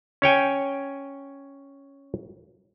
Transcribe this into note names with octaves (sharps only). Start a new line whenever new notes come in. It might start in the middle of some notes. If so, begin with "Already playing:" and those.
C#4 C#5 G5 G#5